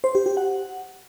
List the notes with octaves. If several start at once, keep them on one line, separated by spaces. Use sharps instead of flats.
C5
G4
G4
F#5